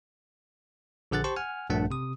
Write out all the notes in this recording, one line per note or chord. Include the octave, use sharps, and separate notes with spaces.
A#1 D3 G#4 F#5 F#6 A6
G4 C5 A5 C6 C#6
F#5 G#5 F6
A#1 G2 A3 D4 F#5 A5
C3 D#6